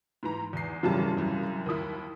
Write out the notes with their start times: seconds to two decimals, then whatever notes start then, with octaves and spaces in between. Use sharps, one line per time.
0.23 G#2 E3 A#5
0.53 E2 C7
0.83 G#1 F#2 C#3 E3 G3 A5
1.17 C2 F#2
1.66 D#2 E4 A#4 D#6